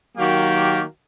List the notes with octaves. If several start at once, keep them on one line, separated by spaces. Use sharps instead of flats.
D#3 F#3 A#3 F#4 G4